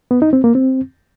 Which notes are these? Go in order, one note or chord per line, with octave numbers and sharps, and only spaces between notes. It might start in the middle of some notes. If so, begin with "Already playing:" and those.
B3
D#4
C4
A#3
C4